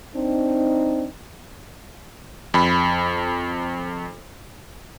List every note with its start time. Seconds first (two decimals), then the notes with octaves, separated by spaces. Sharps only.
0.14 C4 D4 D#4
2.54 F2 B5